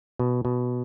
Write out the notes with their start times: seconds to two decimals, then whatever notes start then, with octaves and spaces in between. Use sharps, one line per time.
0.19 B2
0.45 B2